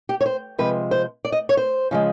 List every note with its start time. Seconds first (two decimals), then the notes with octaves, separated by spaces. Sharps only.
0.09 G4
0.21 C#5
0.26 C5
0.58 C3 F3 G#3 B4
0.91 C5
1.25 D5
1.32 D#5
1.49 C#5
1.57 C5
1.91 C#3 F3 G#3